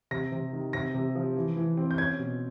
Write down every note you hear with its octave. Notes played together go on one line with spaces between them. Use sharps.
C3 A#6
C3
D#3
C3 A#6
C3
F3
E3
E3
C4
G6
C#4 G#6
B2